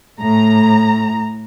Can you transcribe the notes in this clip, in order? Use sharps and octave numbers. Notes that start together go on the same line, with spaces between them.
A2 A#5